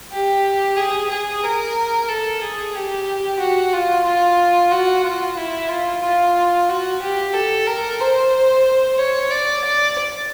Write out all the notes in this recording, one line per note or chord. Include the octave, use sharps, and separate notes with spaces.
G4
G#4
G#4
A#4
A4
G#4
G4
F#4
F4
F4
F#4
F4
E4
F4
F4
F#4
G4
A4
A#4
C5
C#5
D5
D5